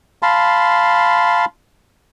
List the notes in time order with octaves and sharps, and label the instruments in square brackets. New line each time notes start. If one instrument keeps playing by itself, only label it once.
[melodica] F5 A5 B5 C6